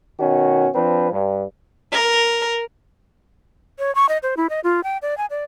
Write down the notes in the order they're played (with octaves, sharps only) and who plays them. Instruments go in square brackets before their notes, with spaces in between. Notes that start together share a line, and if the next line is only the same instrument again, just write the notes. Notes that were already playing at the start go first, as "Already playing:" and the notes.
[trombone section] B2 D#3 C#4 F#4
F3 C4 D4 B4
G2
[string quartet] A#4
[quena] C#5
C#6
D#5
C5
E4
D#5
F4
G5
D5
G#5
D5